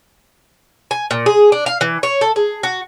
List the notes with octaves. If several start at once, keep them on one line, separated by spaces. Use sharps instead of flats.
G#5
A#2
G#4
D4
F5
E3
C#5
A4
G#4
F#4